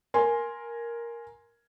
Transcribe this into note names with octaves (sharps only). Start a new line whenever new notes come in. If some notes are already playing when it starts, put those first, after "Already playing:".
A#4 G#5 C6